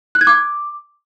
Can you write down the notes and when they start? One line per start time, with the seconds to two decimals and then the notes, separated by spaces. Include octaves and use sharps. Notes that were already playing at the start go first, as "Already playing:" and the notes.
0.15 F#6
0.21 G#6
0.27 D6